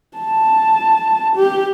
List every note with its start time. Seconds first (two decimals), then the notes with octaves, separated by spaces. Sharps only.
0.18 A5
1.36 G4